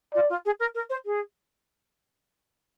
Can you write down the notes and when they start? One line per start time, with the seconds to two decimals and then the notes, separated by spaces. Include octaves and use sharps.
0.14 F4 D5
0.29 F4
0.45 G#4
0.59 A#4
0.74 A#4
0.89 C5
1.05 G#4